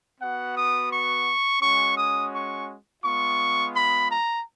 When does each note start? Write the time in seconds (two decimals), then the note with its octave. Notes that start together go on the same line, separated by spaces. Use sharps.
0.20 B3 F#4 F#5
0.55 D#6
0.91 C#6
1.61 G#3 C#4 F#4 C#6
1.97 D#6
2.34 C#6
3.04 G#3 B3 F4 C#6
3.75 B5
4.11 A#5